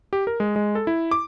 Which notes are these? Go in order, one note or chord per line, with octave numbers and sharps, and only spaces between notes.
G4
A#4
G#3
G#3
A4
E4
D6